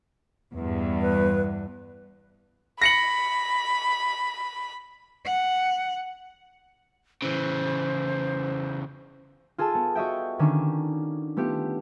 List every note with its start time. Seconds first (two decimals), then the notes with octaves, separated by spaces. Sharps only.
0.54 E2 G2
1.01 B4
2.82 B5 A#6 C#7 F#7
5.26 F#5
7.22 C#3 E3 C5
9.58 F4 G#4 A4 A5
9.75 B3
9.95 F#4 C#5 D#5 E5 G5
10.39 D3 D#3 C#4 D4
11.37 A3 B3 F4 G4